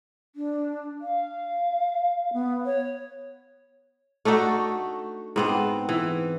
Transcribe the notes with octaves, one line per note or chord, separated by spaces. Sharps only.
D4
F5
B3
C#5
A3 D4 D#4 F#4
G#2 B3 C4
E3